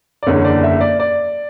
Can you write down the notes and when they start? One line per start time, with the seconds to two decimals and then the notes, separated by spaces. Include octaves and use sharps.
0.23 D5
0.26 F#1 E2 D3 C#5
0.45 D5
0.63 E5
0.81 D5
1.00 D5